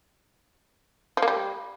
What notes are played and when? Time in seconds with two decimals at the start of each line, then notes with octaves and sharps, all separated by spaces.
1.17 F3
1.22 A#3
1.28 G3